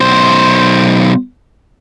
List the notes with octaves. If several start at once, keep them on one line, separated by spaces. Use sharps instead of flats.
B1 C5